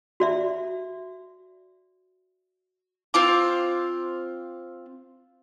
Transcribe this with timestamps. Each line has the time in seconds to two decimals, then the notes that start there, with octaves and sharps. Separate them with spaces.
0.20 F#4 D5 E5
3.14 C4 F4 D6